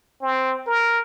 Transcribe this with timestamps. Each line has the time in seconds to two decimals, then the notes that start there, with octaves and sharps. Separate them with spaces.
0.22 C4
0.67 A#4